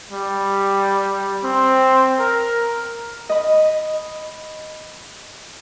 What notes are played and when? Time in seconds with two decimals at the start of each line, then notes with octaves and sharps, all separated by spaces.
0.11 G3
1.44 C4
2.19 A#4
3.29 D#5 B5